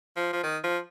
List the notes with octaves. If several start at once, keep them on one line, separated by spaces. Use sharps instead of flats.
F3
F3
D#3
F3